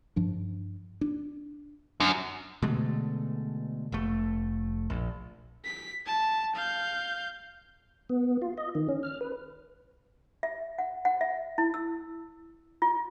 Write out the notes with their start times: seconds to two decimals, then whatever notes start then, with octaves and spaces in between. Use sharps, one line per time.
0.16 G2 F3 D4
1.01 D4
2.00 F#2 D4
2.62 B2 D3 G#3 A3
3.92 F1 A3
4.90 A#1
5.65 B6
6.07 A5
6.56 F5 G6
8.10 B3
8.42 F4
8.58 D#5
8.75 D#3
8.89 C#4
9.03 F6
9.21 B4
10.43 E5
10.78 F#5
11.05 F#5
11.21 E5
11.58 E4
11.74 E6
12.82 F4